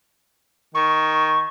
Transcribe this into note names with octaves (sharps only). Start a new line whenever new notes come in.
D#3 C#6